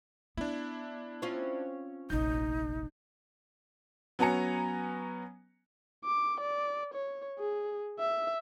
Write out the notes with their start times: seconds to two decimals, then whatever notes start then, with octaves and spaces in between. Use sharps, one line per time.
0.37 B3 D4 E4
1.22 C4 C#4 F4
2.10 F1 A#1 D#4 G6
4.19 F#3 B3 C#4 G#5 A#5 C#7
6.05 D6
6.40 D5
6.94 C#5
7.40 G#4
7.99 E5